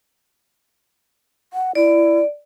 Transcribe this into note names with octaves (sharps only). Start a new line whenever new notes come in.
F#5
E4 D5